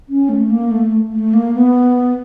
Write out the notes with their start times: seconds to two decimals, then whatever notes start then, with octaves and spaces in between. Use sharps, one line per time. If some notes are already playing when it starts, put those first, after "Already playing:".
0.09 C#4
0.29 A3
0.50 A#3
0.71 A3
1.12 A3
1.33 A#3
1.54 B3